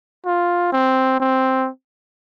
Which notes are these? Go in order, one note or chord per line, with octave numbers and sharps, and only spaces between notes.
F4
C4
C4